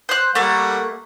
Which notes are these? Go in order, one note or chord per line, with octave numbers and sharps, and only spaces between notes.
C5 F#6
G3 A3 A#3 F#5